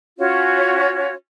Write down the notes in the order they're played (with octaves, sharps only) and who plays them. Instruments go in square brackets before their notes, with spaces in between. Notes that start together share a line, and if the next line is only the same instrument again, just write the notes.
[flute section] C#4 F4 F#4 C#5